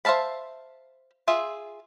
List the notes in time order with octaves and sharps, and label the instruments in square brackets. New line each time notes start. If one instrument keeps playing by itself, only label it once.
[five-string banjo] C5 E5 F5 A5 B5
F4 G#4 E5